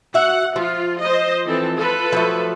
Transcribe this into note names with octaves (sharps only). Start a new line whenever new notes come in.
F#4 E5 F#5
F3 F4
C5 D#5
E3 C4 A4
F4 A4 B4
F3 F#3 A3